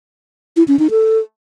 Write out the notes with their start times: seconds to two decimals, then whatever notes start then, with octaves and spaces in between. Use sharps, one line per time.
0.57 E4
0.68 C#4
0.79 D#4
0.91 A4